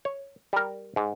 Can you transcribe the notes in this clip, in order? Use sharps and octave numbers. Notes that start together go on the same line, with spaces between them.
C#5
G3 A#4
G#2